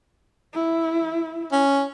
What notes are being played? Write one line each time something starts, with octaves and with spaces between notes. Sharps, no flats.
E4
C#4